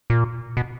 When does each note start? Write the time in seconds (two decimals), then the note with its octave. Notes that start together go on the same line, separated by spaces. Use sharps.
0.10 A#2
0.57 B2